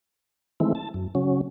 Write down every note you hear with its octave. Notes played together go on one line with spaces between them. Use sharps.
D#3 E3 G#3 A3 C4 E4
A5
F#2
C#3 F#3 C#4